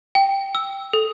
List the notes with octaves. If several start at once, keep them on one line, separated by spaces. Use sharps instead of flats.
G5
E6
A4